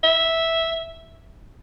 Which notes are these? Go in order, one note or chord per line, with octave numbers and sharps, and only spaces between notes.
E5